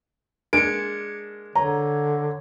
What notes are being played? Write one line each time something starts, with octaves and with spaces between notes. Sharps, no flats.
G#3 A#3 D4 G#6 C#7 D7
D3 C#5 A#5